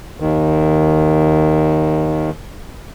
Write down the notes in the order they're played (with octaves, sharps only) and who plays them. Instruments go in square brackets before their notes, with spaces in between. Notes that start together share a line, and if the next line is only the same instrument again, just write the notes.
[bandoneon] D#2 D#3